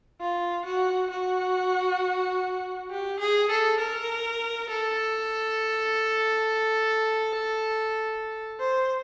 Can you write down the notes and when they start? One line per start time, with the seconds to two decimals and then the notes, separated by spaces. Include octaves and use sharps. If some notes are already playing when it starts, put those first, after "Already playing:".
0.21 F4
0.65 F#4
1.10 F#4
2.91 G4
3.20 G#4
3.50 A4
3.80 A#4
4.70 A4
8.60 C5